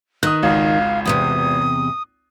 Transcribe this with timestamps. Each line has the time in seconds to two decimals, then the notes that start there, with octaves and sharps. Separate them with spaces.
0.23 D#3 D#6 F#6
0.43 G#1 C#2 F5
1.05 E2 A2 C3 D#6